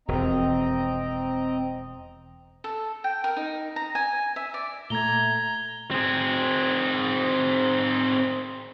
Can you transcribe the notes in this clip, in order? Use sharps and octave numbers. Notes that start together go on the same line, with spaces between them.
E1 F2 C4 D#5 A#5
A4
G5
A#4
D#4
A#5
G#5
E5
D5
A#2 A3 A#5 G#6 G7
C4 G#4